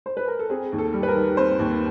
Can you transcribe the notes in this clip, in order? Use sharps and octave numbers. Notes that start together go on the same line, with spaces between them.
C5
B4
A#4
A4
C4 G#4
D#2
A4
G3
B4
A#4
D#3
C4 C5
D#2